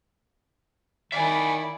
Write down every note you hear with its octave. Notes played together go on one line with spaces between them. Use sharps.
D#3 E4 D5 E5 F5 G#5